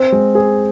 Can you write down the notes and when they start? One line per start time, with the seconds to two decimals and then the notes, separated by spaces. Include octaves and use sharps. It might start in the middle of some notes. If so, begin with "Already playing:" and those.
Already playing: C4
0.12 G#3
0.35 G#4